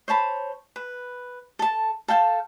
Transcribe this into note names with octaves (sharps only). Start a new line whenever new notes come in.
C5 C#5 A5 B5
B4
A4 A5
A4 F5 G5 A5